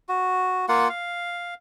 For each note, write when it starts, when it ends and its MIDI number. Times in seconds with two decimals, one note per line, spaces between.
0.09 0.66 66
0.69 0.88 58
0.69 0.88 65
0.69 0.88 78
0.89 1.54 77